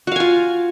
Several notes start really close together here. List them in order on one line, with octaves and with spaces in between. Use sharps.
F#4 F5 G#5 F4